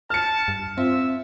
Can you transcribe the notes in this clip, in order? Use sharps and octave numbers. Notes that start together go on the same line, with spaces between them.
A5 F6 C#7
G2
C4 F4 E5